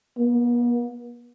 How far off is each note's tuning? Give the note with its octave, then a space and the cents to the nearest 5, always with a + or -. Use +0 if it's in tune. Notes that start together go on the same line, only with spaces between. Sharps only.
B3 -45